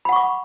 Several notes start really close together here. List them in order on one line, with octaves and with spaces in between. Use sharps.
B5 F#5 C#6 D6